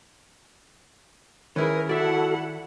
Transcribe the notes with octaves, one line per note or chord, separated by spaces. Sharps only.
D#3 C#4 E4 G#4 A#4 B4
E4 F#4 A4 D5 E5 F#5